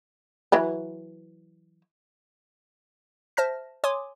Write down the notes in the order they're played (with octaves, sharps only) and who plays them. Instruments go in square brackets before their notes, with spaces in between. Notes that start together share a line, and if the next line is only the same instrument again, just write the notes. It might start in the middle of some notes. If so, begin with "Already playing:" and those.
[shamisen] E3 F#3 B4
[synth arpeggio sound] C5 E5 A5 F6 A#6
C#5 G#5 C6 D6 D#6